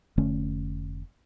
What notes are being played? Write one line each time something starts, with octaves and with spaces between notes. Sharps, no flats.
F1 D3 A3 C#4